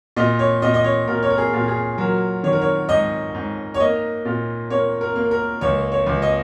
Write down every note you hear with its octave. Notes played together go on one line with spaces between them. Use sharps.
A#2 D#5
C#5
A#2 D#5
D#5
C#5
A#2 A#4
C#5
A#4
G#4
A#2
G#4
F#3 A#4
D#3 C#5
A#4
C#5
G#2 D#5
G#2
C#5
A#3 D#5
A#2
A#3 C#5
A#4
A#3
A#4
C#2 C#5
C#5
C#2
D#5